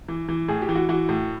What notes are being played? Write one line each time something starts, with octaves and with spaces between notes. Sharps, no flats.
E3
E3
A2 G#4
G4
E3
F#4
E3 F#4
A2